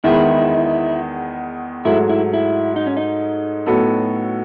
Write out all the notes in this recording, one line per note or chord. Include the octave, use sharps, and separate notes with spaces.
E2 D#3 G#3 B3 E4
G#2 F#3 A3 E4
E4
E4
D#4
C#4
D#4
A2 F#3 B3 F#4 A4